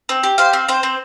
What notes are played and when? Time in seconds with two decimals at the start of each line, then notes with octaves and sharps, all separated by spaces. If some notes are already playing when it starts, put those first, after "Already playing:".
0.09 C4
0.23 G4
0.38 G4 C5 F5
0.53 C4
0.68 C4 C5
0.83 C4